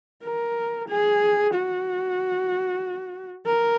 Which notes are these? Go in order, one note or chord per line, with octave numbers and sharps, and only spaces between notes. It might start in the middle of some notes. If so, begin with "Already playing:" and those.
A#4
G#4
F#4
A#4